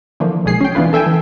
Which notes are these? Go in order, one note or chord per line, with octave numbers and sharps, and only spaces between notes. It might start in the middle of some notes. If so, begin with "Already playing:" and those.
D3 E3 F3 A#3
B1 B2 G#3 G#4 C7
C#4 G5
E3 B3 D4 F4 B4
A4 E5 G5 G#5
E3